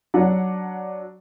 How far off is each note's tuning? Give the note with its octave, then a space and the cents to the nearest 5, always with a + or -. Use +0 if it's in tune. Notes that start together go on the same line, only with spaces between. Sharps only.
F#3 +10 D4 +0 F#5 -10